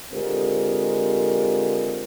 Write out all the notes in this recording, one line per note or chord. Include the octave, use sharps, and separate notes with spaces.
D3 G#3 C4 F4 G4 A#4